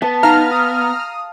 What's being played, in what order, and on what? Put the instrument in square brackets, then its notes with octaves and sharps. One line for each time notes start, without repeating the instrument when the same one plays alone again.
[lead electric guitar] B3 [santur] A5
[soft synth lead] D#4 [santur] F5 [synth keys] A#5 F6
[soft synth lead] D#6